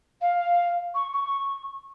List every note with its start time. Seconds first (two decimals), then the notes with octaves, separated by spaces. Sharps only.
0.21 F5
0.94 C#6
1.12 C#6